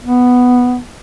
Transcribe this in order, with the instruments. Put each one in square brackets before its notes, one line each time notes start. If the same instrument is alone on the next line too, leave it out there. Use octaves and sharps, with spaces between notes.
[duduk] B3